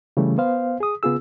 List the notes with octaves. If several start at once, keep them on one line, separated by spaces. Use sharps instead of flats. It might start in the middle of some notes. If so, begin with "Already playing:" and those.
C#3 E3 G3 A3
B3 C5 F5
G#4 D#6
C#3 B3 F4 G#4 E6